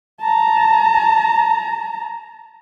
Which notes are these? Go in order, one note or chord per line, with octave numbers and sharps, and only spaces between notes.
A5 A#5